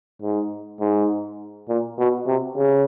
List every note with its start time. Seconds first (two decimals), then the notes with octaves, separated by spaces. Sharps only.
0.22 G#2
0.80 G#2
1.69 A#2
1.98 B2
2.27 C3
2.57 C#3